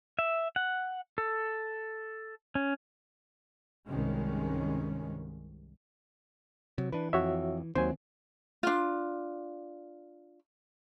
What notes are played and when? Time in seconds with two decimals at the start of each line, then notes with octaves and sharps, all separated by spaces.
0.19 E5
0.56 F#5
1.18 A4
2.55 C#4
3.88 C2 G2 D#3 G#3 C#4
6.78 C3 F#3
6.92 E3 D4 B4
7.13 F2 F#4 C#5 E5
7.75 D#2 D#3 F#3 C4 C5 G#5
8.63 D4 F4